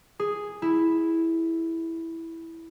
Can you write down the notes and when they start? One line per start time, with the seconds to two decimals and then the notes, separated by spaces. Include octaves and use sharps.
0.20 G#4
0.62 E4